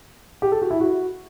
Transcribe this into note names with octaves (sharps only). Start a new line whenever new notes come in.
G4
A4
F#4
E4
F#4